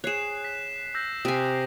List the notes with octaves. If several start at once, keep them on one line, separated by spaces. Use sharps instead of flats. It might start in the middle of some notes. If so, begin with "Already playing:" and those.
G#4 C#5 F#6 C7 E7
B6
E6 G6 A#6
C3 G#5 D#6